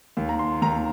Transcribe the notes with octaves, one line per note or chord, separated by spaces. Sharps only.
D#2
A#5
C6
D#2 A#5